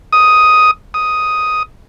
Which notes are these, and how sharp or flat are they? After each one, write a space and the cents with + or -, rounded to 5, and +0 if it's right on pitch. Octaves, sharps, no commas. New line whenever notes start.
D#6 +5
D#6 +5